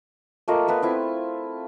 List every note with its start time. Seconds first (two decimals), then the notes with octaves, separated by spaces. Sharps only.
0.48 A3 A#3 F4 D#5
0.68 A3 B3 B4
0.82 C4 E4 F4